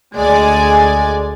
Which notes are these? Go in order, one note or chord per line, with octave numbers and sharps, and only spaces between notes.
D2 G#3 D5 G#5